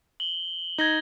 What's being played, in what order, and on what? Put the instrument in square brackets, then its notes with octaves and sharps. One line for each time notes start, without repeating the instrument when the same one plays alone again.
[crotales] F#7 G7
[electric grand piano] D#4 [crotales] G#6 A#6 G7